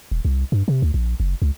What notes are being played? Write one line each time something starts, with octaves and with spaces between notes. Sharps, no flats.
D#1
C2
G2
C3
D2
A#1
F#1
C#2